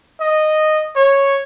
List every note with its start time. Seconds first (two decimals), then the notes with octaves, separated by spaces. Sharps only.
0.21 D#5
0.96 C#5